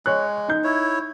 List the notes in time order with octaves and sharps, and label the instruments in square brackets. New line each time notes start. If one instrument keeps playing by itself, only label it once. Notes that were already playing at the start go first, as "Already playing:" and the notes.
[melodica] G#3 [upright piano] C#5 F#6
[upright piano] D#4 G6
[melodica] E4 C#5